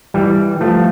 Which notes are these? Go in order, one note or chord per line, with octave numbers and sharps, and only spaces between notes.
E3 G3
F3 A3